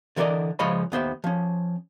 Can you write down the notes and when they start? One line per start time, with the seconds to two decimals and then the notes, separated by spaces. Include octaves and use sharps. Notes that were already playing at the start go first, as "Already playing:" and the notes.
0.16 D3 E3 A#4 B4 D5 D#5
0.59 C#3 F3 G#3 C#5 D#5 B5
0.92 D#2 B3 C5 E5
1.24 F3 C#4